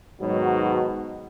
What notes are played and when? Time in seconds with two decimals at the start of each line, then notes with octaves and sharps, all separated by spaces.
0.20 G#2 B2 D#3 F#3